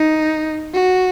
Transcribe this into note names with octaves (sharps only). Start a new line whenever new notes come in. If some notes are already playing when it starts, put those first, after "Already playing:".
Already playing: D#4
F#4